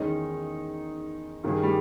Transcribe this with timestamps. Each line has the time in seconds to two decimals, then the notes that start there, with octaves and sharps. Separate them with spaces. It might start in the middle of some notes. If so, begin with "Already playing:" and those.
Already playing: E2 D#3 G#3 C#4 D#4
1.44 G2 D#3 A#3 C#4 G#4
1.63 G3